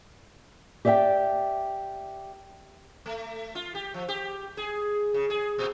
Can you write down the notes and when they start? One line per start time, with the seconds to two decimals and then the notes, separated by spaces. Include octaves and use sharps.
0.85 G4 D5 E5 F5 G5
3.06 A3
3.55 F4
3.75 G4
3.94 F3
4.09 G4
4.57 G#4
5.14 C#3
5.30 G#4
5.58 A#2